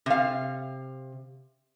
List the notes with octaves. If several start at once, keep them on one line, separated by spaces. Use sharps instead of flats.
C3 F5